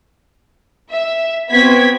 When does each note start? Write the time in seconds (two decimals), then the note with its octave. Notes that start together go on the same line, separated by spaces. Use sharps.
0.91 E5
1.50 B3 C4 F#4 G#6 B6